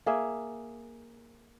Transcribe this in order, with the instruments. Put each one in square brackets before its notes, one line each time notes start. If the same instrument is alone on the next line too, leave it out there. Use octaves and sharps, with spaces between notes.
[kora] A#3 G#4 E5